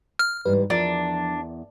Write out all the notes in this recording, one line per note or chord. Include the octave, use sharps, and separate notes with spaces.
F6
G#2 E3 G3 B4
E2 F3 D4 A#4